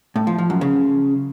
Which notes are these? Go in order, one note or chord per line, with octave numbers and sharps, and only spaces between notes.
A2
F3
F3
F#2
C#3